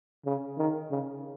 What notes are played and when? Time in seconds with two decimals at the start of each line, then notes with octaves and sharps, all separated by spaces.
0.26 C#3
0.58 D#3
0.90 C#3